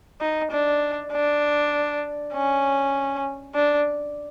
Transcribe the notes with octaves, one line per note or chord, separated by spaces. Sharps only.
D#4
D4
D4
C#4
D4